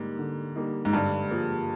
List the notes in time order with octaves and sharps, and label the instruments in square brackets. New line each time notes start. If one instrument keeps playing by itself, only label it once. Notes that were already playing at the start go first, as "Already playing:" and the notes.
Already playing: [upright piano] G#2 [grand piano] D3 G3 A#3 D#4
[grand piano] D3
G3 A#3 D#4
[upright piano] G#2
[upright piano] G2 [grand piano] D3
[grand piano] F3 A#3 F4 G#4